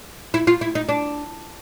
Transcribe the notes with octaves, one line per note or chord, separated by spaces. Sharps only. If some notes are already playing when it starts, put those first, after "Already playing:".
E4
F4
E4
D#4
D4